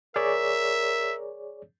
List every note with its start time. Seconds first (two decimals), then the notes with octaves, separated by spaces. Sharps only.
0.16 G#4 A#4 C#5 D5 E5